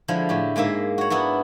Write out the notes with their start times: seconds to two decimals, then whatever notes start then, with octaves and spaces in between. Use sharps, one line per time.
0.08 D3 F3 G#3 E4
0.29 A2 G4
0.56 G#2 G#3 A#3 E5
0.98 F#4 C#5
1.10 B3 D4 E4 F#4